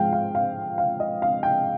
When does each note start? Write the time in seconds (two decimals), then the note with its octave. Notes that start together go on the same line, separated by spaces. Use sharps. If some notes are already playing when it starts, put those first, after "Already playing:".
Already playing: G#2 F3 G#3 F5 G5
0.13 F5
0.35 F5
0.78 F5
1.00 D#5
1.22 F5
1.43 G5